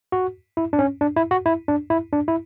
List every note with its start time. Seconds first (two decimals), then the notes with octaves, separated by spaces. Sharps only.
0.12 F#4
0.57 E4
0.73 D4
0.79 C#4
1.01 D4
1.16 E4
1.31 F#4
1.46 E4
1.68 D4
1.90 E4
2.13 D4
2.28 E4